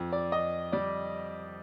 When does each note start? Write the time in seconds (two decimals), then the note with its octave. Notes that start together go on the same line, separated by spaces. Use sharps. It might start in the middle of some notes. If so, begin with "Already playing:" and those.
Already playing: F2
0.12 D5
0.32 F2 D#5
0.72 G3 D5